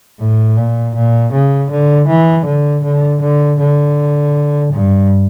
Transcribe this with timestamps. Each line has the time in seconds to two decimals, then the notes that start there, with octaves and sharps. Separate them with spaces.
0.19 A2
0.57 A#2
0.95 A#2
1.33 C#3
1.70 D3
2.08 E3
2.46 D3
2.83 D3
3.21 D3
3.59 D3
4.72 G2